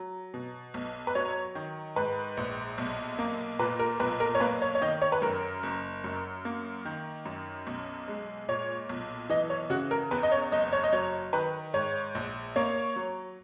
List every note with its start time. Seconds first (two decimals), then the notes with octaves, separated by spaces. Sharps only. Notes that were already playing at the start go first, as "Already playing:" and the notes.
Already playing: F#3
0.34 B2
0.74 B1
1.07 B4
1.15 F#3 C#5
1.55 D#3
1.96 G#2 B4
2.37 A#1
2.78 B1
3.19 A#3
3.59 A#2 B4
3.80 A#4
4.00 B1 B4
4.20 A#4
4.35 C#5
4.40 A#3 B4
4.62 C#5
4.75 C#5
4.82 D#3 D#5
5.02 C#5
5.12 B4
5.22 F#2 A#4
5.63 F#1
6.04 F#2
6.45 A#3
6.85 D#3
7.25 F#2
7.67 B1
8.08 G#3
8.48 A#2 C#5
8.89 B1
9.30 E3 D#5
9.50 C#5
9.70 C#3 F#4
9.91 A#4
10.11 E2 B4
10.23 D#5
10.32 C#5
10.52 F#1 D#5
10.73 C#5
10.84 D#5
10.93 F#3 C#5
11.33 D#3 B4
11.74 G#2 C#5
12.15 A#1
12.56 A#3 C#5
12.96 F#3